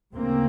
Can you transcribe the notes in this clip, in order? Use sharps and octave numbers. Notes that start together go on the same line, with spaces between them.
D2 C#3 A#3 C4